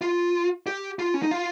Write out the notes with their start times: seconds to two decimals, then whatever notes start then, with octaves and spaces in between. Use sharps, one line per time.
0.02 F4
0.67 G4
0.99 F4
1.14 C#4
1.23 D#4
1.31 F4